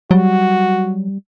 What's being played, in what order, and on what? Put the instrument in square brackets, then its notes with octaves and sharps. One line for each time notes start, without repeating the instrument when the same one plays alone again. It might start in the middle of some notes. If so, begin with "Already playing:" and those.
[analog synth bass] F#3 [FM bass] G3 [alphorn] F#4